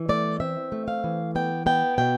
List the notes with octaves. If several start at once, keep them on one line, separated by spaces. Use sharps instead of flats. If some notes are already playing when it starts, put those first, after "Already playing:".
Already playing: E3
A3 D5
C4 E5
A3
F5
E3
B3 G5
B3 G5
B2 G5